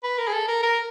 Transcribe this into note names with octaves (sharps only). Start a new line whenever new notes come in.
B4
A#4
G#4
A4
A#4
A#4